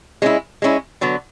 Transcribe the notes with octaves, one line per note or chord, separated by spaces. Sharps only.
G#3 C#4 E4
G#3 C#4 E4
D3 F#3 B3